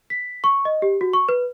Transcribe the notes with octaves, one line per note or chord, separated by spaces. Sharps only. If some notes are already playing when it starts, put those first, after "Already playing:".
B6
C#6
D#5
G4
F#4
C#6
B4